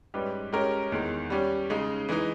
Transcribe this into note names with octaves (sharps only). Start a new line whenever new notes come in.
G#2 G3 C#4 G4 B4
G#3 C#4 G4 A#4 C#5
E2 D#3 G#3
G3 C#4 G4
C#3 G#3 D#4
E3 G#3 D#4